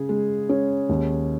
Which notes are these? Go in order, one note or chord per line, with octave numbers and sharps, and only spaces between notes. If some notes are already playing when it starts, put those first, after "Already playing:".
Already playing: C#3 G#4
G#3
C#4
D#2